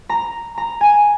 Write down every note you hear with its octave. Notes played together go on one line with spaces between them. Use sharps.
A#5
A#5
G#5